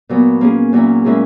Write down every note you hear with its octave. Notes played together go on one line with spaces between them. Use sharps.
A#2 F#3 B3
A#3 C#4 G#4
A#2 F#3 C#4 E4
A#2 G#3 C#4 E4 G#4